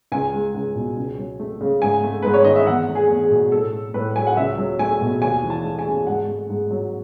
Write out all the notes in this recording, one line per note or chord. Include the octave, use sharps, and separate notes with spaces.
C#2 G#5
G#3
C#2
B2
C#2
F#3
A3
C#3
G#2 G#5
A3
G#2 B4
C#5
D#3 D#5
E5
E2 F#5
A3
G#4
E2
G#4
B2
A2 A4
A3
A2 B4
F#3 G#5
F#5
C#2 E5
F#3
A3 G#5
B2
D#2 G#5
E3
A5
A3
G#5
C#3
G#2 F#5
A3
G#2
F#3